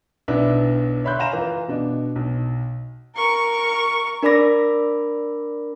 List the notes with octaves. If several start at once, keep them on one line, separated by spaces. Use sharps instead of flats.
B1 B3 D4 E4 D5
C#5 E5 B5 C6 F#6 G6
F5 G#5 A#5 A#6 E7
E3 F4
B2 D4 D#5
B1
A#4 C#6
D4 A#4 D5 B5 D6 A#6